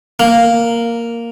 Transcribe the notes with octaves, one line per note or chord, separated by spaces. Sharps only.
A#3